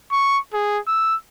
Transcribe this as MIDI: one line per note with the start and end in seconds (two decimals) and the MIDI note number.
0.12 0.39 85
0.54 0.79 68
0.87 1.16 88